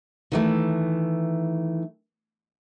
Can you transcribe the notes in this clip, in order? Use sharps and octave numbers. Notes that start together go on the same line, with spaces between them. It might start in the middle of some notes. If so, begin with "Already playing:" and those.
D#3 E3 A3